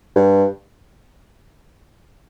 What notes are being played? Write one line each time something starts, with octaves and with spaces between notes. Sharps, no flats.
G2